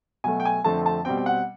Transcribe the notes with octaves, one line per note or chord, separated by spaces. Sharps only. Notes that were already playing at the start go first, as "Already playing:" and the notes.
B2 F#3 A3 G#5
G5
G#5
F2 D3 F3 A3 C4 A5
A5
B2 G3 C4 G5
G5
F#5